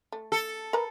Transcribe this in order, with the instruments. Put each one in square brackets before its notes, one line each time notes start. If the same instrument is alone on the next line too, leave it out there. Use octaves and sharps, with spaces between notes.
[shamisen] A3
[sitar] A4
[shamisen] A#4 B4 A#5